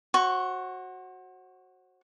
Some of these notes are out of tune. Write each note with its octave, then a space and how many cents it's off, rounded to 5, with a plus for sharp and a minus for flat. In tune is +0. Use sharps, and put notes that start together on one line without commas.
F#4 +0 C5 +40 C#6 +0